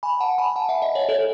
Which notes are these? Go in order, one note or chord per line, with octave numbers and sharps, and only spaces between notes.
G#5 B5
F#5 A5
G#5 B5
F#5 A5
E5 G#5
D#5 F#5
C#5 E5
A4 C#5